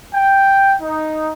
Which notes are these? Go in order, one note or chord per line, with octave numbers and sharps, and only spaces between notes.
G5
D#4